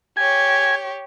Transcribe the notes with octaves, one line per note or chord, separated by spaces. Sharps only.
G4 C#5 G#5